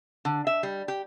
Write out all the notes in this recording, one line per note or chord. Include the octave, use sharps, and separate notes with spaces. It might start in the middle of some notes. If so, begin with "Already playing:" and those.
D3
E5
G3
G4